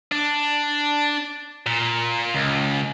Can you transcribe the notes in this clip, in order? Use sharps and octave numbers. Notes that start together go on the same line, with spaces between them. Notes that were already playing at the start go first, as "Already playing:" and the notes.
D4
A#2
C#2